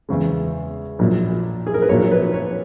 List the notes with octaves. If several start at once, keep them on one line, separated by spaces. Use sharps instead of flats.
E2 C#3 G#3
A#1 A#2 F#3
G#4
A#4
B4
A#1 A#2 F#3 C#5
B4
C#5